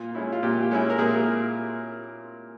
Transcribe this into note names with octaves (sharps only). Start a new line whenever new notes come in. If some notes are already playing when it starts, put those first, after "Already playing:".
Already playing: A#2 F4
G#3 C#4 E4
F4
A#2 G4
G#3 C#4 E4
A#4
A#2 G#4